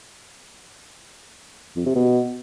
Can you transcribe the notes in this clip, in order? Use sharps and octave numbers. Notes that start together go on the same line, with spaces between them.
F2
C3
B2